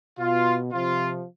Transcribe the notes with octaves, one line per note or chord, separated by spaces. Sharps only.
B2 F4
C3 F3 F4